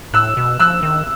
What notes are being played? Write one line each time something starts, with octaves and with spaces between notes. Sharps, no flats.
A2 E6 F#6
B2
F3 E6 F#6
D#3